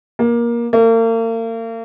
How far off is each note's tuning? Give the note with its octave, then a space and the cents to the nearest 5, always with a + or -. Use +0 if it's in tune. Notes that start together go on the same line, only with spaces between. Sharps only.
A#3 +20
A#3 -40